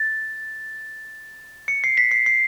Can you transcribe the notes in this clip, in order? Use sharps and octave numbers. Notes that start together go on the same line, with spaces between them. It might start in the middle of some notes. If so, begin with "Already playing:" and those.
Already playing: A6
C#7
C7
B6
C7
C7